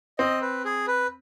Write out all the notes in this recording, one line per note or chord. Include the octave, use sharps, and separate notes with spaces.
C4 D#5
B4
G#4
B4